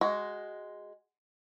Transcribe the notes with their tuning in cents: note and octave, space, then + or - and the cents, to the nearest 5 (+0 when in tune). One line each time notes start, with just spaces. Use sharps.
G#3 +0 F#4 +15